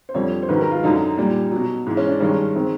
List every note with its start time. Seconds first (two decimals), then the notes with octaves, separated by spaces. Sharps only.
0.09 C5
0.14 F2 D3 G3 C#5
0.43 C5
0.49 G#2 D#3 F#3 B4
0.61 A#4
0.71 F4
0.83 F#2 D3 F#3 D#4
1.17 A#2 G3
1.51 B2 F#3
1.86 G#2 E3 G#3
1.97 C#4
2.09 D4
2.20 G2 D#3 G#3 C#4
2.55 D#3 G#3 C4